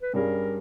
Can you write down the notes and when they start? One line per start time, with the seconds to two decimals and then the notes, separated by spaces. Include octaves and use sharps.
0.02 B4
0.14 G2 G3 C#4 G#4 A#4